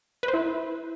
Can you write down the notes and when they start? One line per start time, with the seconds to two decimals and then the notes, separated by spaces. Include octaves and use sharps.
0.23 B4
0.28 C5
0.34 E4